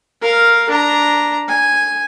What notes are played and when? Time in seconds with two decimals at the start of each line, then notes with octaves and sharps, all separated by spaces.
0.22 A#4 F5
0.70 D4 A#5
1.48 G#5